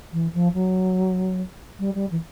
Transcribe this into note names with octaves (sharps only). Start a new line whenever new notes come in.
E3
F3
F#3
G3
G3
E3